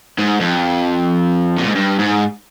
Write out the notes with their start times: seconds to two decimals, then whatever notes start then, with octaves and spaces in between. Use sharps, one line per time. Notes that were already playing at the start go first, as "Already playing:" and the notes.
0.18 G#2
0.41 F2
1.58 A#2
1.67 G#2
1.75 G2
1.99 G#2